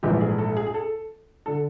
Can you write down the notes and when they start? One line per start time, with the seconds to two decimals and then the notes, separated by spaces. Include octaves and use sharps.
0.03 A#1 G#2 E3 G3 G4
0.21 G#4
0.38 A4
0.57 G#4
0.67 G#4
0.74 A4
1.46 D3 A4